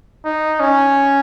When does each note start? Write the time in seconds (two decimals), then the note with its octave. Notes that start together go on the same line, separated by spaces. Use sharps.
0.25 D#4
0.60 C#4